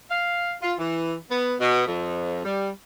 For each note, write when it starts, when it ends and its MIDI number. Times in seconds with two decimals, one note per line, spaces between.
0.11 0.53 77
0.62 0.73 65
0.78 1.14 52
1.30 1.54 59
1.60 1.85 47
1.86 2.40 41
2.45 2.69 55